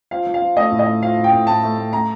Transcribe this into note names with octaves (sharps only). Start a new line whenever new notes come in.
F3 F5
F3
F5
F3
A3 D#5
A2
D#5
A3
F3 F5
A2
G5
A2
A2 A5
A3
A3
A3 A#5